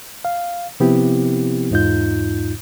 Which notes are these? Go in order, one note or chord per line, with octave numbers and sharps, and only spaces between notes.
F5
C3 F3 B3 C4 E4 G4
E2 G#2 D#4 F4 G6